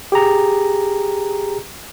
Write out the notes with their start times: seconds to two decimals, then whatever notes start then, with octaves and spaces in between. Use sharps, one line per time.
0.12 G4 G#4 A#5